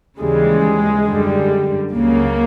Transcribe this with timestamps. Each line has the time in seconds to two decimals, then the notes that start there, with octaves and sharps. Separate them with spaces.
0.20 D#2 C#3 E3 G3 G#3
1.07 F#2 D3 G3
1.94 C#2 C#3 F#3 A#3